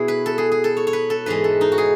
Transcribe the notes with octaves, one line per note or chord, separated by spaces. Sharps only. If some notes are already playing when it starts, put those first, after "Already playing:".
Already playing: B2 E4 F#4 G#4
B4
A4
G#4
G#4
A4
C#5
C#5
B4
A4
G#2 E3 G#3 B4
A4
D#4
F#4
G#4